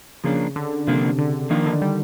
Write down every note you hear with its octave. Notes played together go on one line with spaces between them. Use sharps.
C#3 F3 A#3 D4
D3
C3 F3 A#3 D4
D3
D#3 F3 A#3 D4
D3
G3